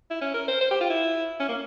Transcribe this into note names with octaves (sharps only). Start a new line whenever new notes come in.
E4
C#4
A#4
C5
C5
G4
F4
E4
C#4
A#3